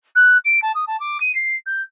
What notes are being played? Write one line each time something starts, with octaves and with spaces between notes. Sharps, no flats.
F#6
D7
A5
D#6
A5
D6
D#7
C7
G6